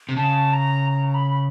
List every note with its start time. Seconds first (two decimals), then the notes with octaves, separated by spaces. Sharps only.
0.09 C3
0.17 C#3 A5
0.53 A#5
0.91 A#5
1.07 A#5
1.14 B5
1.31 B5